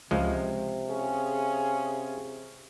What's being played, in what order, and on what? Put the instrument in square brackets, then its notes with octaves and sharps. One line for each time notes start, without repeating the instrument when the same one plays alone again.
[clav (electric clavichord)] C#2 F3 G#3 [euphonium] C3
[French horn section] C#4 F4 G#4